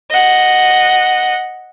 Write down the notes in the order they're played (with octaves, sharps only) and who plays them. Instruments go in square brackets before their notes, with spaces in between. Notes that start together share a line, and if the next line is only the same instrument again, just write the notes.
[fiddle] D#5 F#5